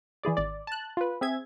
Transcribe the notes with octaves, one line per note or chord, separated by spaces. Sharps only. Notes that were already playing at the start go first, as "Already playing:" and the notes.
E3 E4 G#4 D5
G#1 D5
A5 F#6
F4 B4
C4 G#4 E5 G#6